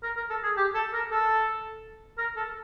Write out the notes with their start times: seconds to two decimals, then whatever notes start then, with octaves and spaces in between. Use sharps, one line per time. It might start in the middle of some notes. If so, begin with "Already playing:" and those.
0.03 A#4
0.17 A#4
0.30 A4
0.43 G#4
0.57 G4
0.74 A4
0.93 A#4
1.11 A4
2.18 A#4
2.36 A4